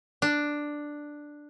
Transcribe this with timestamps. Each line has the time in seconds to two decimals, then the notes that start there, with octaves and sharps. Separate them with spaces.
0.22 D4